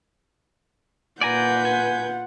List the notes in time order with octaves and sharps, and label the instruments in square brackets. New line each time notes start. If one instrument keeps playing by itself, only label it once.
[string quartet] A#2 B4 G6 [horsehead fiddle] F4 F#5 [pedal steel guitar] D5 G#5 A#5
[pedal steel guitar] G#5